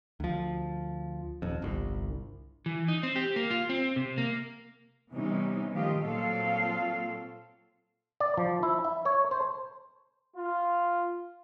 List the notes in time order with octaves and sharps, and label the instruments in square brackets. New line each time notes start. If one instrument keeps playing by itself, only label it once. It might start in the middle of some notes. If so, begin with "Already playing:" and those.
[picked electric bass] D2 F3
D#1 F2
G1 C2
[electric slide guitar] E3
D#4
C4
G4
A#3
F4
C4
C3
A#3
[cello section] C3 E3 G3 B3 C#4 D#4
D#3 F3 A3 F4 G4 D#5
A#2 F#3 C4 F4 A4 F5
[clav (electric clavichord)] D5
F3
E4
E5
C#5
C5
[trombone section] F4